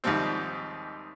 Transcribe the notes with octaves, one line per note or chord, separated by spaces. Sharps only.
D#2 G#2 C3 F3 G3 C4